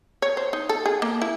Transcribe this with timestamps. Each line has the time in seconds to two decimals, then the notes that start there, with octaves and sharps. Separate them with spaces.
0.22 C#5
0.37 C5
0.53 D#4
0.69 A4
0.86 G#4
1.02 A#3
1.22 E4